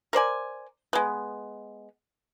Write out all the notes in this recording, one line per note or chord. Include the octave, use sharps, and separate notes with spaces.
A#4 C5 D5 G#5
G#3 B3